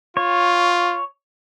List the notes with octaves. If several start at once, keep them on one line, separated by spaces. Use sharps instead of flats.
F4 C#5